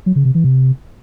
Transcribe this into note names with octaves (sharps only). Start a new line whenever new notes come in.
F#3
C#3
C3
E3
C3